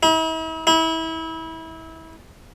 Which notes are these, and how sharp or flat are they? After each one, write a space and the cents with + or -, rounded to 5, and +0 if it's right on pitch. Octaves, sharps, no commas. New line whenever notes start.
E4 -45
E4 -30